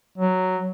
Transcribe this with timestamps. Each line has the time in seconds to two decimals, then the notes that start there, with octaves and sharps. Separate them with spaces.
0.18 F#3